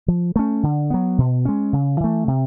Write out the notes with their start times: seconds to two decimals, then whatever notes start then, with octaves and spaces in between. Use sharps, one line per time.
0.08 F3
0.36 A3 C#4
0.63 D3
0.90 F#3 B3
1.18 B2
1.45 G#3 C#4
1.73 C#3
2.00 E3 A3
2.28 C3